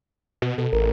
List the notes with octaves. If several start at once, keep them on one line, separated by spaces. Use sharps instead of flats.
B2
B2 A4
A1 A#4